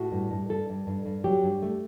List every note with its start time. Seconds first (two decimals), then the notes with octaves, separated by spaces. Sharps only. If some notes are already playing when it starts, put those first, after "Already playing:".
Already playing: A2 F#4
0.12 G2
0.31 G2
0.49 G2 A4
0.69 G2
0.87 G2
1.06 G2
1.24 F#3 G4
1.43 G2
1.62 A3